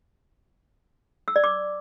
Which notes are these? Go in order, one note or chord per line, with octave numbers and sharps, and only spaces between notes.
E6
D5
D6